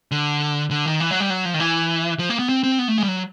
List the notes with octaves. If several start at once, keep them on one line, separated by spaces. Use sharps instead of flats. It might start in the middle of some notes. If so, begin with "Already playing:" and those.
D3
D3
D#3
E3
F#3
G3
F#3
F3
D#3
E3
F3
A#3
B3
C4
C4
B3
A3
G#3
G3
F#3